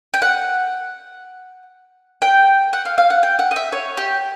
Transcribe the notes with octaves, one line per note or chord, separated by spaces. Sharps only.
G5
F#5
G5
F#5
F5
F5
F#5
G5
F#5
D#5
E5
C#5
G4